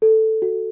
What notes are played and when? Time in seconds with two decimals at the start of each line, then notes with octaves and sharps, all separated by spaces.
0.02 A4
0.42 F#4